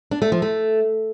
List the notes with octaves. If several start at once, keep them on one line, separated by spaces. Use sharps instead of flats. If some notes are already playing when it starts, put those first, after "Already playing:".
D4
A3
F3
A3